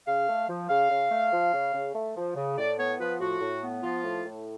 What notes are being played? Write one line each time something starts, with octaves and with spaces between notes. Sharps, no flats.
C#3 F5
A3
F3
C#3 F5
C#3
A3
F3
C#3
C#3
A3
F3
C#3
A2 D5
B3 C#5
F3 B4
A2 F#4
A2
B3
F3 F4
A2
A2